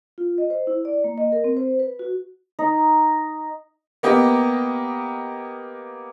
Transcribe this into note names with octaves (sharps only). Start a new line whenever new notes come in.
F4
D#5
C5
E4
D5
A#3
D#5
A#4
C4
C5
B4
F#4
D#4
A#3 B3 G4 D#5